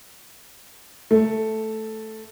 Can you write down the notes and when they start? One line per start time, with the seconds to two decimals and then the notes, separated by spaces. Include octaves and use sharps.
1.11 A3